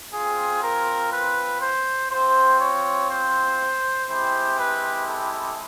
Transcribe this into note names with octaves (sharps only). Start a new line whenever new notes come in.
C4 F4 G#4
A#4
B4
C5
C4 F4 C5
C#5
C5
G#3 C4 E4 G4 C5
B4
A4